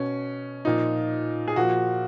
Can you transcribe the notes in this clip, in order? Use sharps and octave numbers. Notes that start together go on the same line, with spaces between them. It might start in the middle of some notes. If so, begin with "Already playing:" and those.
Already playing: B2 C#4
A#2 F3 D#4
G#4
A#2 F3 F#4